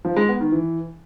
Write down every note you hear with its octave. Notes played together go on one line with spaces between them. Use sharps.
F3
G#3
B3
D#3
E3